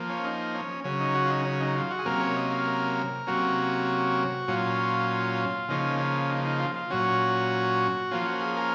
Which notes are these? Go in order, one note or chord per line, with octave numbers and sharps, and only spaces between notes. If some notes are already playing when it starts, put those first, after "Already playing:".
Already playing: F3 A#3
C#4
D#4
C#4
C#3 F#3 C#4
D#4
F#4
F4
D#4
C#4
D#4
F4
F#4
G#4
C3 F#3 A#3 C#4 A#4
C#5
D#5
F5
A#4
C3 F#3 A#3 C#4 F#4
A#2 F#3 C#4 F4
C#3 F3 A#3 C#4 D#4
C#4
D#4
D#4
F4
F4
A#2 F#3 C#4 F#4
F3 A#3 C#4 F4
F#4
G#4
A#4